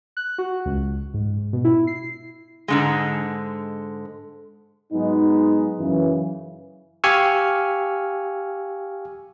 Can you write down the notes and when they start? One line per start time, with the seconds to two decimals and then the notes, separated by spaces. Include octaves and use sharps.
0.17 F#6
0.38 F#4
0.65 C#2
1.14 G#2
1.53 B2
1.64 E4
1.87 C7
2.68 G#2 D3 G#3
4.92 G#2 F#3 G#3 B3 D#4
5.78 F#2 C#3 E3
7.04 G4 F5 G#5 C#6 E6 F6